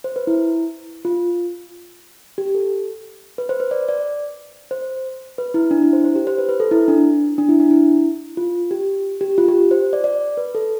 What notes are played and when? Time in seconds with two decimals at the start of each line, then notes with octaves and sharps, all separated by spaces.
0.04 C5
0.16 B4
0.27 E4
1.05 F4
2.38 G4
2.55 A4
3.38 B4
3.49 C5
3.60 B4
3.71 D5
3.88 D5
4.71 C5
5.38 B4
5.54 E4
5.71 D4
5.83 E4
5.93 C5
6.04 C5
6.16 G4
6.27 C5
6.38 B4
6.49 B4
6.60 A4
6.71 E4
6.88 D4
7.38 D4
7.49 E4
7.60 D4
7.71 E4
8.37 F4
8.71 G4
9.21 G4
9.38 F4
9.48 G4
9.71 C5
9.93 D5
10.04 D5
10.37 B4
10.55 A4